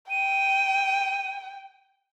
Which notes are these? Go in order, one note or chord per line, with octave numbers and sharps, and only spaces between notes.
G5 D#7